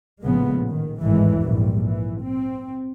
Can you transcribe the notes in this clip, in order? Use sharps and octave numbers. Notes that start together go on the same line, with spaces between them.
A#1 A2 C#3 F3 G#3 B3
D#3
G#1 E2 A2 E3 G#3
A#1 G#2 G3
E3
C4